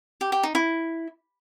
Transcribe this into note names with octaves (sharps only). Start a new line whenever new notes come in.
G4
G4
D#4
E4